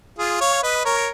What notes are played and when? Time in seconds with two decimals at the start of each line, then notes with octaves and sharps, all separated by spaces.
0.19 F4 G#4
0.41 C#5 F5
0.63 B4 D#5
0.85 A#4 C#5